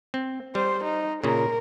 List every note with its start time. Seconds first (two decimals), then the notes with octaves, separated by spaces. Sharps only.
0.14 C4
0.55 G3 C5
0.84 D#4
1.24 A#2 C#3 A#4